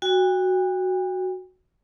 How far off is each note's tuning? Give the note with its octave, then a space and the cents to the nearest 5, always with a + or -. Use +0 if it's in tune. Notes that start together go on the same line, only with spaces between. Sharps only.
F#4 +0 G5 +40